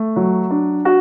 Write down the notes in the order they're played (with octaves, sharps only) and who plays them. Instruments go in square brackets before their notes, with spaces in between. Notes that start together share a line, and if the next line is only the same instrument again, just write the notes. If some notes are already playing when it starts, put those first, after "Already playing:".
Already playing: [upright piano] A3
F#3
D4
F#4